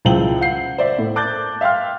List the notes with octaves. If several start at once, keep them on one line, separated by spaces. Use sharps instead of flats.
C#2 F3 E4 C5 G5 F#7
F5 F#5 G6 C7
C5 D5 E5
A2
A5 D6 F#6 G6 A6
E5 F5 G5 C6 F6